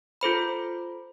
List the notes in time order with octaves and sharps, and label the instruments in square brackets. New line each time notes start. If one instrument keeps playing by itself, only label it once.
[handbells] F4 A4 C5 B5